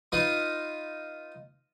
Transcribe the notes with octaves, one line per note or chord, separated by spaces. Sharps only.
D#4 F4 B4 D#5